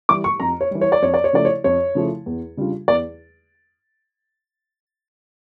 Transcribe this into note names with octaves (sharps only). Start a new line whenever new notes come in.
E3 G3 D6
C#6
F2 A#5
C#5
E3 G3
C#5
D5
F2 C#5
D5
C#5
C#3 F3 A3 E4 D5
C#5
F2 C#5
C#3 F3 A3 E4
E2
C#3 G3 D4 F4
E2 D5